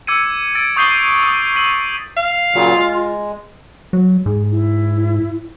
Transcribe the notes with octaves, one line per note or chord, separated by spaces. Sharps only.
D6 E6 G#6 C#7 D#7
E6 A6 D7
C#6 D#6 G6 C7 F#7 G7
D#6 D7
E6 B6 D#7 F#7
F5
A#2 C#3 F#3 F4
G#3
F#3
G#2 G#4
E4